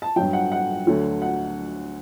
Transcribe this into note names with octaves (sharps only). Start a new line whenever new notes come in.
A5
G2 F#3 G5
F#5
F#5
D2 D3 F#3
F#5